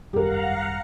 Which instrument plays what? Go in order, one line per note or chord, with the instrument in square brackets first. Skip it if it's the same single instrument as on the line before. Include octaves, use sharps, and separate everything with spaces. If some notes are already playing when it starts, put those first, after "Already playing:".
[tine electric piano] G#1 F#2 G3 [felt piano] G4 A#4 [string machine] F5 F#5 A#5